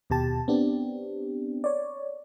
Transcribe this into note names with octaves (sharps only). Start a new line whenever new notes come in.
D#2 B2 G4 A5
B3 C4 D4 G4
C#5 D5